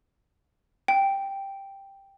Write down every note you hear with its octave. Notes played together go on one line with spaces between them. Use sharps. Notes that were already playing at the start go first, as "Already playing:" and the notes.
G5